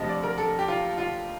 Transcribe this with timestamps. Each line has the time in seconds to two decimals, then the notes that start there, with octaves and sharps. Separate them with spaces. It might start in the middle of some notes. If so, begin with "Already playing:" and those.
Already playing: D2 C3 F3 D#5
0.08 D5
0.23 A#4
0.38 A4
0.59 G4
0.68 F4
0.98 F4